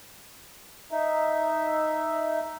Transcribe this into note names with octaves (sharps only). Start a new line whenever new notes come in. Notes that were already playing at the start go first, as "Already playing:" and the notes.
D#4 E5